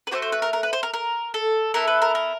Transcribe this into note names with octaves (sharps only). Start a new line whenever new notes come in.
B4
A3 D4 F#4 C5
C5
B4
A#4
A#4
B4
C5
A#4
A#4
A4
B3 E4 A4 A#4
B4
A#4
A#4